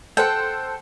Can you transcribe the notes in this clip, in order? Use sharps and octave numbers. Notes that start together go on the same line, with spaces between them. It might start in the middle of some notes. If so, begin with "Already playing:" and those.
A4 C5 F#5 G5